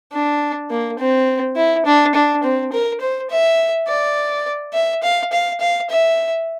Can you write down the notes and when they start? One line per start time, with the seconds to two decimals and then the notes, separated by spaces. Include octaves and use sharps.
0.13 D4
0.70 A#3
0.99 C4
1.56 E4
1.86 D4
2.15 D4
2.43 C4
2.73 A#4
3.01 C5
3.30 E5
3.88 D5
4.74 E5
5.03 F5
5.32 F5
5.60 F5
5.90 E5